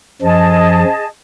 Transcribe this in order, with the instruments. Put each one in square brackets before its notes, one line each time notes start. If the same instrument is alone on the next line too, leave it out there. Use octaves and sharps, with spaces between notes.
[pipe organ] F#2 F3 [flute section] G#4 D#5 A5